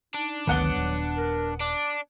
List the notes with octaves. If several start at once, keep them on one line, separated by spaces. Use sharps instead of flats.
D4 D#4
G#1 D2 D#3 F#3 B3 F#5 G7
D#1
A#4
D4 D6